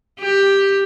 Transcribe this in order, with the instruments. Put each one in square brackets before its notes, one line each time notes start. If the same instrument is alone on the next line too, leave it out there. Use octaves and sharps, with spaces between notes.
[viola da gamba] G4